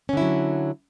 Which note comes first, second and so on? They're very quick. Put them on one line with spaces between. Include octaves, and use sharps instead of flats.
C#4 D3 E4 F#3